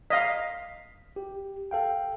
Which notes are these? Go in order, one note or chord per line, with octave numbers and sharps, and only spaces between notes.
D#5 F5 B6
G4
A4 F5 G5